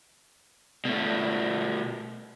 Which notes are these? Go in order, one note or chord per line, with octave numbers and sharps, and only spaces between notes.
B2 A3